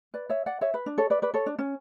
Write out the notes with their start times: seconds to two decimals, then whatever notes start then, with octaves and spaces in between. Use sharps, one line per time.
0.14 B4 D5
0.30 C#5 E5
0.46 D5 F#5
0.61 C#5 E5
0.74 B4
0.86 D4
0.98 A4 C#5
1.10 B4 D5
1.22 B4 D5
1.34 A4 C#5
1.46 D4
1.59 C#4